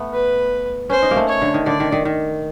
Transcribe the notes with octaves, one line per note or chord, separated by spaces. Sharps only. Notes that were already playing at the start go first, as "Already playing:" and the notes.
Already playing: A3 B3
B4
C#4 C5
D#4
A#3
A3
C#5
D3
D#3
D3 D5
D#3
D#3
D#3